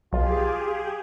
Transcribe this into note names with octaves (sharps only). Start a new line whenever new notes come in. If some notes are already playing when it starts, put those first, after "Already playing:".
B1 F4 G4 G#4